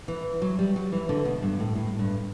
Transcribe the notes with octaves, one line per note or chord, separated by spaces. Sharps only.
E3
F#3
G3
F#3
E3
D3
B2
G2
A2
A2
G2